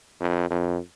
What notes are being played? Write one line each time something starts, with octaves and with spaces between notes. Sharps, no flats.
F2
F2